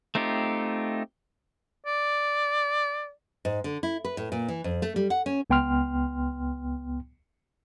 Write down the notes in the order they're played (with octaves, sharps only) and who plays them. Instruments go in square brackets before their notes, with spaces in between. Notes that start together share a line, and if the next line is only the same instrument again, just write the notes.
[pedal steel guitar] A3 C4 D#4 F4 G4
[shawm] D5
[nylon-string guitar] G#2
D3
E4
B4
A2
A#2
E3
F2
A3
G3
F#5
C#4
[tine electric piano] C#2 B3 G5 C6 F6